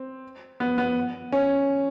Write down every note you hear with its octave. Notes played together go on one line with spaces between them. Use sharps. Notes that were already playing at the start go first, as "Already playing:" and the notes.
Already playing: C4
B3
B3
C#4